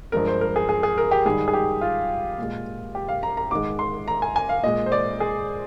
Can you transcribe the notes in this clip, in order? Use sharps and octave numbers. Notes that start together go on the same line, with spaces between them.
G2 F3 G#3 A#4
C5
A#4
G#4
G#4
G#4
A#4
G4
G#2 D#3 G3 G#4
G#4
G4
F4
A#2 G#3
G4
F5
A#5
A#5
G#2 D#3 G#3 D6
C6
A#5
G#5
G#5
F5
A#2 G#3 D#5
C5
D5
G#4